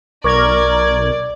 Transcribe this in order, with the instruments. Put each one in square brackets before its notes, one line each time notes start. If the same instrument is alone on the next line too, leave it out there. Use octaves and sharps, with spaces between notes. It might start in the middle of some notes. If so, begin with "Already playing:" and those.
[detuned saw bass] B1 [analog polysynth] A#4 G#6 [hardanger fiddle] D5 [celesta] C#6 D6